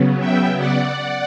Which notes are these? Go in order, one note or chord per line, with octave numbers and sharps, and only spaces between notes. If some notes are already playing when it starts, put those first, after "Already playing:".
Already playing: C#3 F#3 B3
E5 G5
D5 F#5